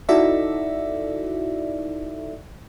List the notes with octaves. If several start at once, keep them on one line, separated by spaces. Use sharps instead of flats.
D#4 E4 F#4 A4 D5 E5